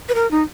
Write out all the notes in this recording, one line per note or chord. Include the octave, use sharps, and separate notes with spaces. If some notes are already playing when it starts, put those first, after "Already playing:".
B4
A#4
D#4